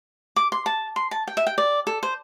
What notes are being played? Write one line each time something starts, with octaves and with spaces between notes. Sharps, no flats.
D6
C6
A5
C6
A5
G5
E5
G5
D5
A4
C5